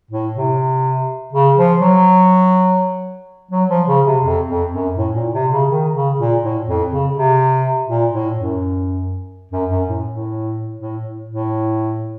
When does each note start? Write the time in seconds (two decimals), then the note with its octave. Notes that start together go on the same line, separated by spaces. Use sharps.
0.11 A2
0.35 C3
1.32 C#3
1.56 F3
1.81 F#3
3.51 F#3
3.69 F3
3.87 C#3
4.06 C3
4.24 F2
4.48 F2
4.73 F#2
4.97 A2
5.15 A#2
5.33 C3
5.51 C#3
5.70 D#3
5.94 C#3
6.18 A#2
6.42 A2
6.67 F2
6.91 C#3
7.15 C3
7.88 A#2
8.12 A2
8.37 F#2
9.52 F#2
9.70 F#2
9.88 A2
10.07 A2
10.80 A2
11.28 A2